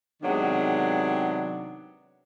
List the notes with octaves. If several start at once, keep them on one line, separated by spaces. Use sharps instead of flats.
C3 D#3 F#3 G#3 B3 D4